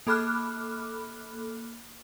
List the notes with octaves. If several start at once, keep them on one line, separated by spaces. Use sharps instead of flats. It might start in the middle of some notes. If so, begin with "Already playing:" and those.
A#3 A4 B5 D6 F6 F#6